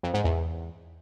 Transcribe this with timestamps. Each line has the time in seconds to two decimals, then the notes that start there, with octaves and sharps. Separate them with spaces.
0.03 F2
0.14 G#2
0.24 E2